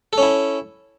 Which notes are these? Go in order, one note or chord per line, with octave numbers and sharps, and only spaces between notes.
C#4 E4 A4